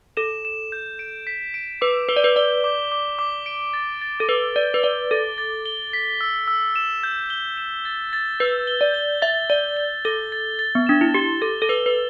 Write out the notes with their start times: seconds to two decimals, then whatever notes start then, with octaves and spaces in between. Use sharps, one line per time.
0.17 A4 E7
0.45 E7
0.72 G6
0.99 D7
1.27 B6
1.54 D7
1.81 B4 D6
2.09 B4 G7
2.16 D5
2.24 B4
2.36 D5 G7
2.64 D6
2.92 D6
3.19 D6
3.46 D7
3.74 A6
4.01 A6
4.20 A4
4.29 B4 G7
4.56 D5 A6
4.74 B4
4.83 D5 G7
5.11 A4 A6
5.38 A6
5.66 G7
5.93 B6
6.21 E6
6.48 E6
6.76 E7
7.03 G6
7.30 G7
7.58 E7
7.85 A6
8.13 A6
8.40 B4 G6
8.67 G7
8.81 D5
8.94 G7
9.22 E5 A6
9.50 D5 G7
9.77 G7
10.05 A4 G7
10.32 A6
10.59 A6
10.75 B3
10.87 D4 E7
11.01 E4
11.14 G4 G7
11.41 A4 A6
11.62 A4
11.69 B4 G7
11.86 B4